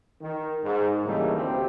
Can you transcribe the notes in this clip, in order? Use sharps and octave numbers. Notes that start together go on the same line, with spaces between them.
D#3
G#2
C#3 E3 G3 A3 A#3 D#4
D2 C4 G4